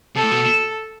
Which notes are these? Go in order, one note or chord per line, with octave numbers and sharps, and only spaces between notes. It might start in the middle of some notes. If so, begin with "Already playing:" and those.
C3 A4
A2
B2